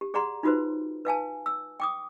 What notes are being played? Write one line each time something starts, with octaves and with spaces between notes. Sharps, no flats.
G4
G#4 D5 F#5 A#5 C6
D#4 F4 F#4 B4 C5
B4 F5 G#5 A5
E6
G5 D6 D#6